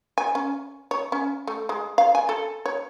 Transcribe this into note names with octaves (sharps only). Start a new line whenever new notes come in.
G#5
C#4
C#5
C#4
A3
G#3
F5
G#5
A4
C#5